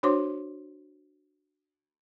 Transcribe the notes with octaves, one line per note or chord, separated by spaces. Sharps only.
D4 F#4 C5 C#5 C6 D6